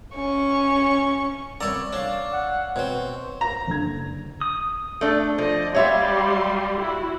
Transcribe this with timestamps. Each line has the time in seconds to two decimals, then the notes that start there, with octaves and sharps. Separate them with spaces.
0.15 C#4 C#6
1.61 C2 B3 C#5 D5 A#5 E6
1.93 D4 C#5 D5 F5
2.32 F#5
2.76 B2 C4 C5 C#5
3.41 A#5
3.67 F#1 D3 G#6
4.41 D#6
5.01 A3 D4
5.38 F3 D5 D#5
5.75 G3 G4 C#5 E5 F5 C6
6.81 E4 F#4